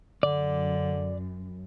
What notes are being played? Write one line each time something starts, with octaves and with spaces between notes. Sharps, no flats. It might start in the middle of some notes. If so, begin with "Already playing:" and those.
F#2 D3 D5